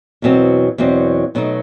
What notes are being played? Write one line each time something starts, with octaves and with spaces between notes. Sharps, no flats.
E2 B2 F#3 C4
E2 B2 F#3 C4
B2 F#3 A3 D#4